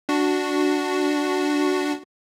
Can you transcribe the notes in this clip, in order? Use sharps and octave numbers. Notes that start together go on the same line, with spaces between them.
D4 F#4